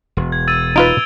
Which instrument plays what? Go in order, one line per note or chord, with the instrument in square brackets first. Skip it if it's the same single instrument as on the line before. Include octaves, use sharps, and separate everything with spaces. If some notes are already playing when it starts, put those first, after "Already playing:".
[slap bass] E1
[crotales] G#6
E6 A6 D#7
[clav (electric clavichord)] D#4 F4 B4 [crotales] D7 F7 G7